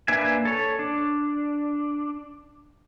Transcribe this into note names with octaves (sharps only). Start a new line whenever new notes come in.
A#3 D4 B4 E5 G#5
A4 C#5
D4